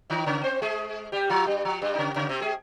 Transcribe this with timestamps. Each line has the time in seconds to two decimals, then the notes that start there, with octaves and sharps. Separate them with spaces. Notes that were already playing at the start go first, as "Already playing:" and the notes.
0.10 D#3 D#4
0.26 C#3 C#4
0.43 C4 C5
0.62 G#3 G#4
1.12 G3 G4
1.29 F3 F4
1.47 G2 G3
1.65 F3
1.82 G2 G3
1.95 D#4
1.98 C#3 C#4
2.16 C#3 C#4
2.29 C3 C4
2.41 G#3 G#4